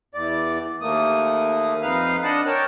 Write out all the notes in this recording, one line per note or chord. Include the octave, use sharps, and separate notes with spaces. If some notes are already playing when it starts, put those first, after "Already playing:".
E2 D5
D#2 A3 A#3 D#6
F2 D#4 B4 F5 F6
D4 D#5 F#5 A5
A#4 C#5 G5 A5